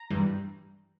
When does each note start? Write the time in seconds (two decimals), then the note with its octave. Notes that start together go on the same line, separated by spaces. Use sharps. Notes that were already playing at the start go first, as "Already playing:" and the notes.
Already playing: A#5
0.10 G2 E3 G3